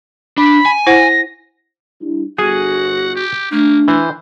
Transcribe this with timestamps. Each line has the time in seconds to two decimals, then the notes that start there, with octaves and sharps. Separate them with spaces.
0.37 D4 B5
0.66 G#5
0.87 E4 C5 F#5 A#6
2.01 G3 D4 E4
2.38 G1 F#4 G#4 F#5 G#5
3.15 G4
3.52 A3 A#3 D4
3.88 E3 C5